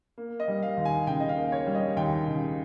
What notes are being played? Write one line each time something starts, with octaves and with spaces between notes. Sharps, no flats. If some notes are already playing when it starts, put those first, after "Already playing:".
A#3
D#5
G3
F5
D#2
G#5
C#3 G5
D#5
F5
A#3
C#5
G3
D#5
D#2 G5
C#3